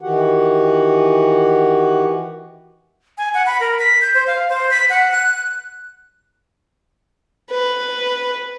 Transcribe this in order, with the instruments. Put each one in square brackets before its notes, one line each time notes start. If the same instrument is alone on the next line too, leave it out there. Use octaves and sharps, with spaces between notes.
[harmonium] D#3 E3 F#4 G4 F#5
[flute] G#5
F#5
B5
A#4
B6
G6
C5
F5
C5
B6
F#5
F#6
[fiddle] B4